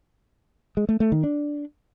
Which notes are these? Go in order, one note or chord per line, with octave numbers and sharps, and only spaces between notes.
G#3
A3
A3
D#3
D4